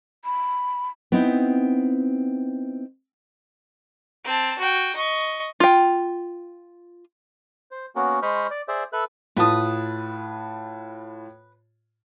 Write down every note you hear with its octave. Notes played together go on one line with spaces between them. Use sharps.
B5
B3 C4 D#4 E4
C4 A5
F#4 G5
D#5 C#6
F4 G5
C5
A#3 B3 C#4 F#4 A#4
G#3 C5 D#5 B5 C#6 F6
D5
G#4 C5 D5 E5
A4 B4 E5 F#6
A2 F4 B4 A5 D#6